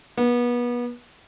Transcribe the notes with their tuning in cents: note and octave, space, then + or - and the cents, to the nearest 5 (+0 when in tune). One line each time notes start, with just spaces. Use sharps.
B3 -30